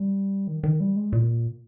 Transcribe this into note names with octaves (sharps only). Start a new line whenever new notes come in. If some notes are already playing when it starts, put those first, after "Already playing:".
Already playing: G3
D#3
D#3
G3
G#3
A#2